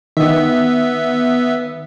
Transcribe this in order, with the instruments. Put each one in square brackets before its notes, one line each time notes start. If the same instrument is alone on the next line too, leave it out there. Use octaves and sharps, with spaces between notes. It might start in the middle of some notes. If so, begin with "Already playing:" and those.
[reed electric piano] D#3 [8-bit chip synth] B3 E5